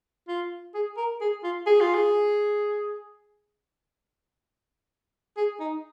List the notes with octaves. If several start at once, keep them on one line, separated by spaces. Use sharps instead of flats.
F4
G#4
A#4
G#4
F4
G#4
F4
G#4
G#4
D#4